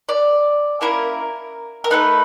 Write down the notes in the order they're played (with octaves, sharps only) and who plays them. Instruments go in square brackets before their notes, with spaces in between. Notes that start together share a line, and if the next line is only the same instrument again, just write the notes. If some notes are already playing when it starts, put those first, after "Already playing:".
[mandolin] D5
A#3 C#4 E4 A#4
A#4
A3 C4 D#4 B4